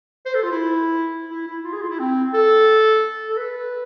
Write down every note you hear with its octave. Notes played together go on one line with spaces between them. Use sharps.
C5
A4
F4
E4
E4
E4
F4
G#4
F4
E4
C4
A4
A4
B4